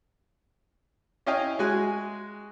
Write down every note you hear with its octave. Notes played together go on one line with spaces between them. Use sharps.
C#4 E4 D#5 F5 G5 G#5
G#3 F#4 G#5 F#6